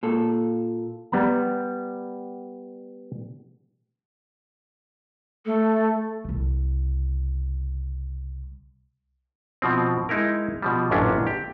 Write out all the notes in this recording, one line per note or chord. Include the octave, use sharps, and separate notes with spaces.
A#2 A4
G3 B3 A#5
A3 A4
C2 C#3
B2 F3 C4
G#3 D#4 E4 A#4
B2 F3 G3
A1 F#2 A#2 D3 C#4 D4
G4